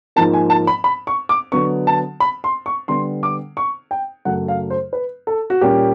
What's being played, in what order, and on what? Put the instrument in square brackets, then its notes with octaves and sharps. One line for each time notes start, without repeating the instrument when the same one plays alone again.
[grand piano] G#2 F3 A#3 A5
G#5
A5
B5
B5
C#6
D6
D3 F#3 B3 C#6
A5
B5
C6
C#6
D3 G3 B3 C6
D6
C#6
G5
F#2 C#3 F#3 A3 F#5
F5
C5
B4
A4
F#4
A#2 G3 A#3 C#4 G4